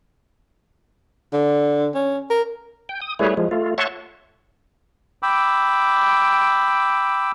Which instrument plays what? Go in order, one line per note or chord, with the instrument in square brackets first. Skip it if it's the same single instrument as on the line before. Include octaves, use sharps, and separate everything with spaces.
[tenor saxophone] D3
C#4
A#4
[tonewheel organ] G5
D#6
G3 A3 E4 G#4 B4 C#5
F3 G#3
A3 F4
C#5 E5 F#5 A5 C6 C#6
[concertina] G5 B5 D6 E6